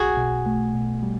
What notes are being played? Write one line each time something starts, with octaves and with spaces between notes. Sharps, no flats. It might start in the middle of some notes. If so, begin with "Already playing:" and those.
Already playing: B1 F#4 G#4
B2
A3
B2
G3